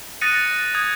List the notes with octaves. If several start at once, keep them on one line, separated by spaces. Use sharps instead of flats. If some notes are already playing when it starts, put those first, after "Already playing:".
D#6 F#6 A6 A#6 C#7 D#7
D#7
D#6 G#6